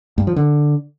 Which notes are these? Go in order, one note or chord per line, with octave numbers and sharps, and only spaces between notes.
G2
F3
D3